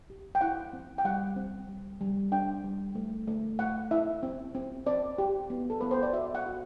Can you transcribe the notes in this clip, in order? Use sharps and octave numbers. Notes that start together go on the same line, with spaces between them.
G4
G5
E4 F#5
C4
G5
G3 F#5
C4
G3
G3
D4 G5
G3
A3
A3
A3 F#5
E4 E5
C4
C4
C4 D5
G4
B3
A4
B3 B4
C5
D5
F#4 E5
F#5
F#4